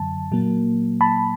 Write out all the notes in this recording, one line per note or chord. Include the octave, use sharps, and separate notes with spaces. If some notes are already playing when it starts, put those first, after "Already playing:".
Already playing: F#2 D3 F#3 A5
A#2 F#3 A#3
A5 B5